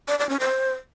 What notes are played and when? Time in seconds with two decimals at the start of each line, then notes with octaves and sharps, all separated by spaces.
0.08 D5
0.19 D5
0.29 C#4
0.40 C5